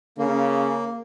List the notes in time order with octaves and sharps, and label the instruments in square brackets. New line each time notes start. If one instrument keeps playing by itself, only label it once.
[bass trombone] C#3 [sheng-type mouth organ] A#3